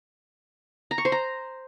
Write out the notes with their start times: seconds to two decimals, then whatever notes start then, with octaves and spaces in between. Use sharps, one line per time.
0.91 A#5
0.98 C#6
1.05 C5
1.12 A#5